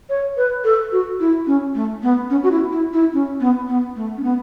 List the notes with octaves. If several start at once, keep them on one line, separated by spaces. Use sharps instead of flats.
C#5
B4
A4
F#4
E4
C#4
A3
B3
C#4
F#4
E4
E4
E4
C#4
B3
B3
A3
C#4
B3